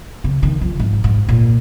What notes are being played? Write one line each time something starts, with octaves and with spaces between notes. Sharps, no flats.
C#3
D#3
F3
G#2
G#2
A#2